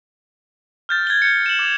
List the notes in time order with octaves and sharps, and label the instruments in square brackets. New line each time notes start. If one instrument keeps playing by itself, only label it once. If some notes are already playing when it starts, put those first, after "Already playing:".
[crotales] F6 G6 A6
G#6 G7
G6 G#6 C#7
E7 F#7
D6 F7